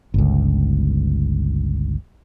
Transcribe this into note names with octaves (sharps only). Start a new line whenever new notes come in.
G1 C#2